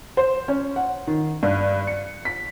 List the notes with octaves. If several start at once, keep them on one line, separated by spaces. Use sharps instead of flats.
C5
C#4
F#5
D#3
G2
C#7
B6